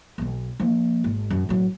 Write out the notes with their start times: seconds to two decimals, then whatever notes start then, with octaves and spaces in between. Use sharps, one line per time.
0.18 B1 B3
0.60 F3 A#3
1.04 G#1
1.30 F#2
1.49 A1 F#3